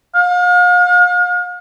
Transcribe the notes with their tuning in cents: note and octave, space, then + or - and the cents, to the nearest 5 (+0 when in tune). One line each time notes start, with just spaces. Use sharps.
F5 +40